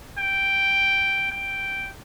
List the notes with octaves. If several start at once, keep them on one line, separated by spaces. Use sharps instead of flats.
G5
G5